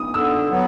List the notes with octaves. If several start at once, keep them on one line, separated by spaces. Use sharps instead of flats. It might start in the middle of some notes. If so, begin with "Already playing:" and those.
Already playing: D#6
D3 E6
F#3 B3